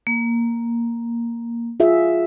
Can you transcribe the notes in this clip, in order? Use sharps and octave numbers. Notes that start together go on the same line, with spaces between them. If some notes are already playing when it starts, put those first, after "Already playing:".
A#3
F4 G#4 E5